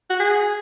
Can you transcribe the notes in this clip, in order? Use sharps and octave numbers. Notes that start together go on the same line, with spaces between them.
F#4
G#4